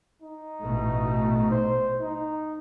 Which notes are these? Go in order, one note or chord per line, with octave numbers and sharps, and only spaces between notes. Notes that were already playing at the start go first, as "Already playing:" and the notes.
D#4
A1 B2 A3
C5
D#4